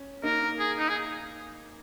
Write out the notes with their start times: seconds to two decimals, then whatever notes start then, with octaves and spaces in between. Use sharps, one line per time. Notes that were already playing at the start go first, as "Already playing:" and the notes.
Already playing: C#4
0.23 A#3 D#4 A#4
0.59 G#4
0.78 D#4
0.89 G#4